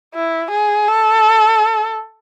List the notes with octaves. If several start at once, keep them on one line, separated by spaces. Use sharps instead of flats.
E4
G#4
A4